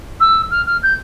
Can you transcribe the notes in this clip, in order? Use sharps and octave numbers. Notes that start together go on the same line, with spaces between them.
E6
F6
F6
G6